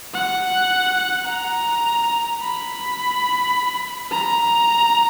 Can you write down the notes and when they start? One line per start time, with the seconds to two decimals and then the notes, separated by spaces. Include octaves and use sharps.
0.14 F#5
1.27 A#5
2.41 B5
4.11 A#5